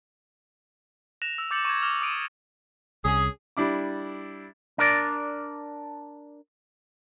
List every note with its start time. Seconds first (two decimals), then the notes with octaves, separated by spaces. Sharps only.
1.22 F#6 A#6 E7 F7
1.38 E6
1.51 D6 G6 A6 C#7 F#7
1.65 C#6 D6 G#6
1.82 D6 F6 F7
2.01 D#6 E6 D7 D#7
3.05 C2 C#4 G#4
3.57 G3 D4 E4 D6
4.78 D4 A#4 D5